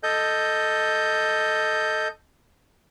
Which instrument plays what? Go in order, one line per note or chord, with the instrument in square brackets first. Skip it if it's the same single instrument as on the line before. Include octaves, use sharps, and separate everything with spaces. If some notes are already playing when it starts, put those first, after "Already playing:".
[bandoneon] A4 D#5 G6